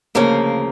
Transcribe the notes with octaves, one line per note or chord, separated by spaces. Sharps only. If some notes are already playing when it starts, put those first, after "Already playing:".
D2 C#3 F3 A#3